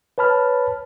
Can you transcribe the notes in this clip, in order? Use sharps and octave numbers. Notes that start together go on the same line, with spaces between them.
B4 C#5 A5 B5 F6